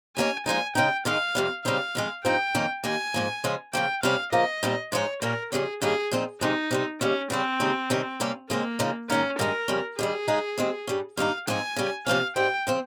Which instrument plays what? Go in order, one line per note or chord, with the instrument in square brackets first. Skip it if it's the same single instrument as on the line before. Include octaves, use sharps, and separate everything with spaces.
[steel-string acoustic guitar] D#2 D#3 A#3 C#4 [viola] G#5
[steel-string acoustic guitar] A#2 F3 G#3 D#4 [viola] G#5
[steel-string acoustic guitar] C#3 G#3 D#4 [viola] G5
[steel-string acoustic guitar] G#2 D#3 G#3 D#4 [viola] F5
[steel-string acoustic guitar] F2 C3 G3
[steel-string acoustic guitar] C#3 G3 C4 D#4 [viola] F5
[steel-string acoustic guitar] F2 D#3 G#3
[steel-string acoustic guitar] G2 F3 C4 D#4 [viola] G5
[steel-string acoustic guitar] F2 D#3 A#3 C#4
[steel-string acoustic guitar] D#2 D#3 A#3 [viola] G#5
[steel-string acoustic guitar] G#2 F3 A#3
C#3 F3 G#3 C#4
[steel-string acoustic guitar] C#3 F3 A#3 [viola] G5
[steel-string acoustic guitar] C3 G3 C#4 [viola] F5
[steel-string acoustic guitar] C#3 F3 A#3 [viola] D#5
[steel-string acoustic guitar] A#2 G3 C4 D#4
[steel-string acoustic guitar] G#2 F3 G#3 D#4 [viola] C#5
[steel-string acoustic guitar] A#2 G3 C#4 [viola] A#4
[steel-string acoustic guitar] F2 C#3 G3 C#4 [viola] G#4
[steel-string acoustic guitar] G2 D#3 A#3 C#4 [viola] G#4
[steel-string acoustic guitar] A#2 F3 C4 D#4
[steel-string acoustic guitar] F2 C3 D#3 G#3 [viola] D#4
[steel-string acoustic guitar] C3 G3 C4
[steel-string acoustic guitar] D#2 C#3 G3 [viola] C#4
[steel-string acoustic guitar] C#3 G3 C#4 [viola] C4
[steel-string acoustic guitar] D#2 C#3 G#3 D#4
C3 D#3 G3 C#4
C3 G3 A#3 C#4
[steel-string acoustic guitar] C#3 G#3 C4 [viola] A#3
[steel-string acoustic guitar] C#3 F3 G#3 D#4
[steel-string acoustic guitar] G#2 D#3 A#3 D#4 [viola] C#4
[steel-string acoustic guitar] G2 D#3 G#3 D#4 [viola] A#4
[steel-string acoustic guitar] F2 C#3 G3 C#4
[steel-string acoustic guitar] G2 D#3 G3 [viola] G#4
[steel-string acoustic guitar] C#3 G#3 D#4
D#2 D#3 G#3 C4
G2 G3 C#4
[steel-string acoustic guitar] G2 D#3 A#3 D#4 [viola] F5
[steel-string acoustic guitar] G#2 F3 C4 D#4 [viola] G#5
[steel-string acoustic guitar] C#3 G3 C#4
[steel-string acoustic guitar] C3 F3 A#3 C#4 [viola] F5
[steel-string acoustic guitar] G#2 G3 C4 [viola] G5
[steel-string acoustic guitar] C#3 F3 C4